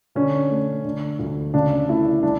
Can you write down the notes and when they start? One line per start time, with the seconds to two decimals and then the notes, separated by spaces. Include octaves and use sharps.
0.15 D3 C#4
0.50 A3
0.85 D3
1.19 D2
1.54 C#3 D4
1.88 A3 E4
2.23 G#3 D4